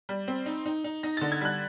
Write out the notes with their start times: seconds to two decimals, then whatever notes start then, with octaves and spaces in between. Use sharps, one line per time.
0.09 G3
0.28 C4
0.46 D#4
0.66 D#4
0.84 D#4
1.03 D#4 A#6
1.17 D3 A6
1.32 G#6
1.41 G3 F#6